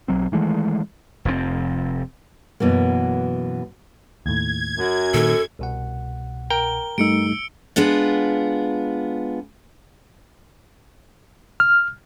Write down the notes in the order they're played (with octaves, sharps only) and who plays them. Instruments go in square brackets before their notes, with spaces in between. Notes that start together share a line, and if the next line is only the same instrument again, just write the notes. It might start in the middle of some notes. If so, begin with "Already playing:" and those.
[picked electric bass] B1 F#3 C4
D#3 E3 G#3 A3
[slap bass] F1 F2 A2 C4
[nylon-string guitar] F#2 B2 E3 A#3
[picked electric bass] D#2 A2 [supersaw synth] G#6
[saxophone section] F#2
[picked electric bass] A#2 D#3 [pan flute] A4
[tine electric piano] C2 B2 F#5
[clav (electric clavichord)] A#4 G5 [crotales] G7
[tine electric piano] G2 [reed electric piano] G3 A3 D#4 [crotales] E6 C#7 D7
[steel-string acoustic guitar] G#3 B3 D4 F4 F#5
[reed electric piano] F6